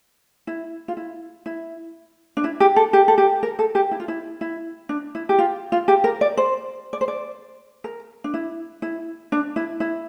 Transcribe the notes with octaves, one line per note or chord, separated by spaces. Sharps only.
E4
F4
E4
E4
D4
E4
G4
A4
G4
A4
G4
A#4
A4
G4
E4
F4
E4
E4
D4
E4
G4
F4
F4
G4
A#4
D5
C5
D5
C5
D5
A#4
D4
E4
E4
D4
E4
E4